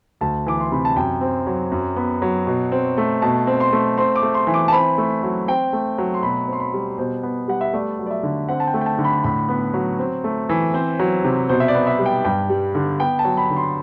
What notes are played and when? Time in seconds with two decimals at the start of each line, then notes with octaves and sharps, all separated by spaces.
0.21 D2 A5
0.46 E3 D6
0.60 C6
0.72 C3 B5
0.85 A5
0.96 F#2 G5
1.21 C4
1.47 F#3
1.72 F#2
1.96 B3
2.22 F#3
2.47 B2
2.72 C4
2.97 A3
3.22 B2 A5
3.47 C4
3.60 C6
3.72 A3
3.98 C4 C6
4.16 D6
4.23 A3
4.34 C6
4.47 E3
4.54 D6
4.68 A5
4.72 C4 B5
4.98 A3
5.23 F#3
5.48 C4 G5
5.73 A3
5.98 F#3
6.14 C6
6.23 B2 B5
6.47 C4
6.53 C6
6.60 B5
6.74 G3
6.98 B2 C5
7.23 B3
7.48 G3 F#5
7.61 E5
7.73 A3 D5
7.99 F#3
8.06 D5
8.11 E5
8.23 D3
8.49 C4 F#5
8.60 A5
8.67 G5
8.74 A3
8.81 G5
8.86 A5
8.98 D3
9.04 B5
9.24 A2 B5
9.49 B3
9.74 F#3
9.99 C4
10.24 A3
10.49 E3
10.74 C4 C5
10.99 F#3
11.24 C3
11.49 B2 C5
11.60 E5
11.68 D5
11.75 B3
11.87 E5
11.99 G3
12.06 G5
12.25 G2 G5
12.50 G3
12.75 D3
12.99 B3 G5
13.19 A5
13.25 F#3
13.37 B5
13.50 D3
13.57 C6